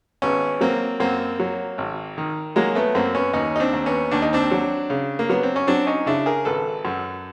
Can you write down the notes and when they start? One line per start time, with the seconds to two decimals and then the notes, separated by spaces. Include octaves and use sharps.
0.22 G#1 B3 C#4
0.61 F#3 A#3 C4
1.00 F#2 A#3 C4
1.40 F#3
1.78 G#1
2.18 D#3
2.56 F#3 G#3 A#3
2.75 A3 B3
2.95 F#2 A#3 C4
3.15 B3 C#4
3.33 D#2 C#4 D#4
3.56 D#4
3.60 C4 D4
3.73 D#2
3.86 B3 C#4
4.11 D#2 D4
4.22 D#4
4.33 C4 D4
4.51 F#3
4.90 C#3
5.19 A#3
5.29 F#3 B3
5.43 C4
5.56 C#4
5.67 F#3 C4 D4
5.87 C#4 D#4
6.06 C#3 D4 E4
6.26 G#4 A#4
6.45 G#1 A4 B4
6.85 F#2